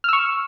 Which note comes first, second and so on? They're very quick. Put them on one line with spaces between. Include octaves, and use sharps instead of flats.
F6 E6 C#6